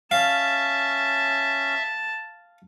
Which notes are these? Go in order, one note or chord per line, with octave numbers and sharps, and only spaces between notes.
C#4 E5 F5 A5